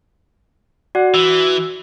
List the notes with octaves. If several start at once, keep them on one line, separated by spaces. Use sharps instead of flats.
F#4 D5 F#5
E3 E6